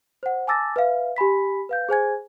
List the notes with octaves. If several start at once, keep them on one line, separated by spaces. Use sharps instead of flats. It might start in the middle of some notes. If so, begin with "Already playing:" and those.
C5 F#5
G#5 A5 D6 E6 A6 A#6
B4 E5 F5
G4 G#5 B5 B6
B4 F5 G6
G#4 C5 G#5 G#6